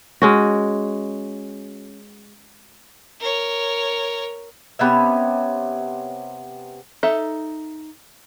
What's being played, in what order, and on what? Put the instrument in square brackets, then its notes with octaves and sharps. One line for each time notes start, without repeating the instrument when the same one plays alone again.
[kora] G#3 C#4 F#4
[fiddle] A#4 C#5
[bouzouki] C3 B3 C#4 E5
[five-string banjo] D#4 A4 E5